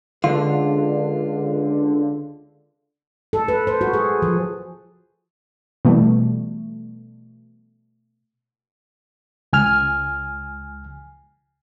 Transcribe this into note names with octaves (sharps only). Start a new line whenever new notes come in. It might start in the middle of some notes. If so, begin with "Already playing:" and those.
C#2 D3 F4
A4
B4
C5
F#4
G#4
F3
B2 E3 G3 A3
C#2 G#5 F6